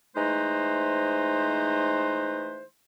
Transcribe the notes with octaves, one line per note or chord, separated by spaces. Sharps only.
E3 G#3 A3 D#4 B4 C5